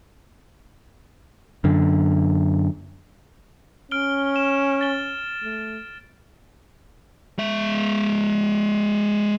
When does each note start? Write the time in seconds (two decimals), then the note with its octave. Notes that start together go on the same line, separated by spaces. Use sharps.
1.64 F#2 D3
3.91 C#4 F6 D7 G7
4.36 E7
4.81 A6 G7
5.42 A3
7.39 G#3 E5